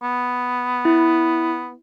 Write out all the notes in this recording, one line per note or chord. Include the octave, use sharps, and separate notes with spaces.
B3
E4